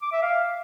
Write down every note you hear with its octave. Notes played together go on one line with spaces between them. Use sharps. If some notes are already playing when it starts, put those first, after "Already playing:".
D6
E5
F5